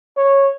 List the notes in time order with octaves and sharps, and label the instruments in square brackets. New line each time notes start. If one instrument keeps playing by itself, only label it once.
[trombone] C#5